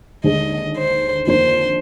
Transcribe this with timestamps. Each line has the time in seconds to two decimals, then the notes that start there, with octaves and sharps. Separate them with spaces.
0.24 D#2 D3 G#3 D4 D#5
0.76 C5
1.27 F2 D#3 A#3 D4 C5